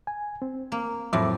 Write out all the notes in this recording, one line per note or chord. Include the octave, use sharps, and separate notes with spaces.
G#5
C4
A#3
F2 A2 F#3 E5 D6